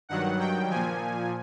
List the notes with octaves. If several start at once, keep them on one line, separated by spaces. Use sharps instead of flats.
G2 D#3 F#3 F#5
G5
A#2 F3 G#5